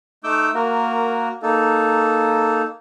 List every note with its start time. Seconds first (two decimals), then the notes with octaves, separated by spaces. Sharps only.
0.24 A3 D#4 D6 E6 G6
0.54 A#3 F#4 A#4
1.42 A#3 D#4 A4